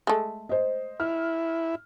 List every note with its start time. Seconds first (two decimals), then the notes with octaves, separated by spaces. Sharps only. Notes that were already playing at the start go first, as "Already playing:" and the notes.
0.07 G#3 A3
0.49 C5 D#5
1.00 E4 F6